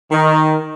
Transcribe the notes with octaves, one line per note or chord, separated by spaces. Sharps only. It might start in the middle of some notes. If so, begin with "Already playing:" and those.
D#3